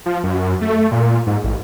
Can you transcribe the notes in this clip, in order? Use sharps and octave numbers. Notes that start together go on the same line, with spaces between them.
F3
F#2
A3
A#2
G#2
A1